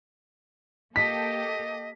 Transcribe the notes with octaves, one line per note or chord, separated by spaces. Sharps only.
A#3 G4 A4 D#5 B6